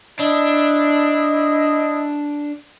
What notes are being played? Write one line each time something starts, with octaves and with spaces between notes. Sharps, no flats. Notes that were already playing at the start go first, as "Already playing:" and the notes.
D4 E4 D#5